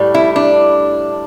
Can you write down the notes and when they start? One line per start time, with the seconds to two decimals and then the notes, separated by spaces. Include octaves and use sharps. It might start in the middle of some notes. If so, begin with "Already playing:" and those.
Already playing: A2 G3
0.14 E4
0.36 D4